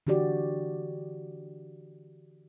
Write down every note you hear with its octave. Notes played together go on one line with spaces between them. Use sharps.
D3 E3 F#4 G4 D5